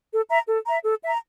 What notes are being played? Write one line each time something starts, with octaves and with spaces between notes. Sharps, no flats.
A4
E5 A#5
A4
E5 A#5
A4
E5 A#5